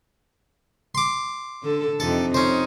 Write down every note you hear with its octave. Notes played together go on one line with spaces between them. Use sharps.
C6 D6
D3 A4
F2 C3 D#4 A4
C#4 D#4 C5